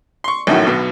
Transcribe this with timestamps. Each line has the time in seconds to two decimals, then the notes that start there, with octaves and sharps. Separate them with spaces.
0.24 C6 C#6
0.47 A#1 F#2 A2 D#3 C#4 F#4
0.67 B1 B2